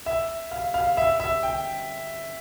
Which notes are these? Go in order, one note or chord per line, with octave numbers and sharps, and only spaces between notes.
E5
F5
F5
E5
E5
G5